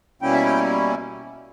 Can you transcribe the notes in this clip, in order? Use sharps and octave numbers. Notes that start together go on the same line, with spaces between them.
B2 G3 A#3 C#4 E4 G5
E5
G5